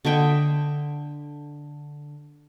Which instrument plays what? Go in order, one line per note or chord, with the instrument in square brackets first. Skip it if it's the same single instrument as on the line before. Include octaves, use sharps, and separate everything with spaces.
[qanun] D3 D#5 E5 G5